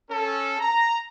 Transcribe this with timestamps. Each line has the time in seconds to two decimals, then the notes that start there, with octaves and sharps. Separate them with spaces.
0.11 C#4 A4
0.60 A#5